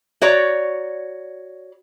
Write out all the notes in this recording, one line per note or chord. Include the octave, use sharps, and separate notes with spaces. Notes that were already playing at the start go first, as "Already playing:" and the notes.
F#4 C#5 D5 A#5